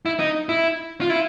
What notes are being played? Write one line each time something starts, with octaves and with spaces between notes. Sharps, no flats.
E4
D#4
E4
F4
E4